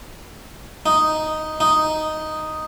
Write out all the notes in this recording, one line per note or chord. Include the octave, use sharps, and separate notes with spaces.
D#4
D#4